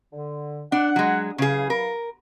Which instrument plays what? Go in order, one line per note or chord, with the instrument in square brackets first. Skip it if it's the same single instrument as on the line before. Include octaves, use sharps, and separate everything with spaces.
[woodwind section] D3
[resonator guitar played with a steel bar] D4 [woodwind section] F#5
[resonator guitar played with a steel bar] F#3 G#3
[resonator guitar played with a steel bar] C#3 G#4 [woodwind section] E3 F#3 F5
[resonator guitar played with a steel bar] A#4